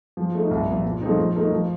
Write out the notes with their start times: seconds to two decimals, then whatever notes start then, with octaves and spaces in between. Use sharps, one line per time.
0.17 F3
0.34 A3 D#4
0.51 C2
0.68 A#2 F3
0.85 A#2
1.01 F3 A3 C4 D#4
1.19 F3
1.35 A3 D#4 A#4
1.53 F3